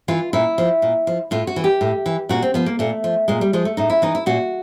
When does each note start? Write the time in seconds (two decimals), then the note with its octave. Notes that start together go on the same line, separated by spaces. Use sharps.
0.08 E3 F4
0.33 A#2 E4
0.58 F3
0.82 A#2
1.07 F3
1.31 A2 F4
1.47 F#4
1.56 E3
1.64 G4
1.81 A2
2.06 E3
2.29 A#2 F#4
2.42 C4
2.54 F3 B3
2.66 A#3
2.79 A#2 A3
3.04 F3
3.28 A#2 G#3
3.41 G3
3.53 F3 G#3
3.65 A3
3.77 A2 D#4
3.90 E4
4.02 E3 D#4
4.15 E4
4.26 A#2 F#4